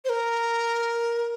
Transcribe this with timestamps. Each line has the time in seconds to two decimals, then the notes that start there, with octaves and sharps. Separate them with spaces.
0.05 C5
0.09 A#4